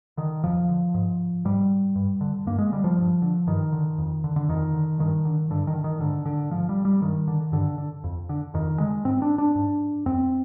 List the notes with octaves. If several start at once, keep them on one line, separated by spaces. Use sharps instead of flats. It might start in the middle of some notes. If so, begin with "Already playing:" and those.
D3 D#3
F2 F3
D3
G#2
G#2 G3
G2
D3
G2 A#3
G#3
D3 G3
F3
G2
D3
G2 D#3
D3
F2
D3
D3
F2 D#3
D3
G2 D#3
D3
G2 D3
D#3
D3
D#3
G#2 D3
D3
G#2 F3
G3
G3
G2 D#3
D3
G2 D3
D3
F2
D3
F2 D#3
D3 G#3
G#2 C4
D4
D4
G#2
F2 C4